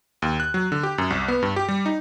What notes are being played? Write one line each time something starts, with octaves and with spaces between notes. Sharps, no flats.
D#2
F#6
F#3
D3
G4
F#2
C2
B3
G2
G4
G3
D#4